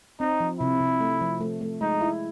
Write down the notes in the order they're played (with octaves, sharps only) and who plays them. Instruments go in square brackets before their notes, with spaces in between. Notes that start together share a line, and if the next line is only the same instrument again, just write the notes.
[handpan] C4 [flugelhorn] D#4
[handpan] F3
[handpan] C3 [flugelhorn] E4
[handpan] C3
A3
F3
A3
A3
[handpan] G#3 [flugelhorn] D#4
[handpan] E4